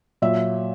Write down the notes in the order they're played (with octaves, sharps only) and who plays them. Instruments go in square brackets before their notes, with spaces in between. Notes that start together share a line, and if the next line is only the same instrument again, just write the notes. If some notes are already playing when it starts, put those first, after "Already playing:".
[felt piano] A#2 F#3 E5